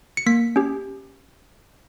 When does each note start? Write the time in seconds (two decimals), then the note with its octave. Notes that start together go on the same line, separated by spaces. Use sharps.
0.17 C#7
0.26 A#3 B6
0.56 C#4 G4